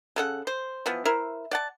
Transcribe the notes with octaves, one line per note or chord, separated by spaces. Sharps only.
C#3 A4 F#5
C5
E3 F3 B3
E4 A#4 C5
D5 F#5 A5